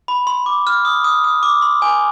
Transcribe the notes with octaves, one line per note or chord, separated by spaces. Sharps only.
B5
C6
D6
F6
D#6
D#6
D#6
D6
C6
G#5